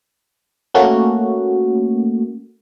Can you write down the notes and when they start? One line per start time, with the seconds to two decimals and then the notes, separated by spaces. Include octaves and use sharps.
0.74 A3 A#3 C#4 F#4